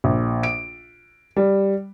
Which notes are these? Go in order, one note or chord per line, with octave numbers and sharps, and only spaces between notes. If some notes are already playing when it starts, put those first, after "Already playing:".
A#1
D7
G3